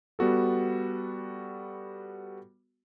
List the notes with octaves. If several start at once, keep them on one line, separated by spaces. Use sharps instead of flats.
G3 B3 F#4 A4